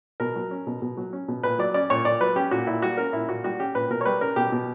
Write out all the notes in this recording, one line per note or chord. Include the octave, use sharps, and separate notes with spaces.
B2 A#4
F#3
C#4
B2
B2
F#3
C#4
B2
A#2 B4
F#3 D5
C#4 D5
A#2 C#5
A#2 D5
F#3 B4
C#4 G4
A#2 F#4
A#2 E4
G3 F#4
C#4 A#4
A#2 E4
A#2 F#4
G3 F#4
C#4 G4
A#2 B4
B2 A#4
C#5
G3 B4
C#4 A#4
B2 G4
B2